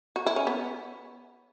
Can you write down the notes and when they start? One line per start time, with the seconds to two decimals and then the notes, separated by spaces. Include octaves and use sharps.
0.16 F#4
0.26 E4
0.36 C#4
0.47 B3